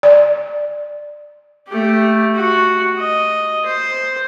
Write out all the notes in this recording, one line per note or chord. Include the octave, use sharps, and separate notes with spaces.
D5
A3 G4
F#4
D#5
C5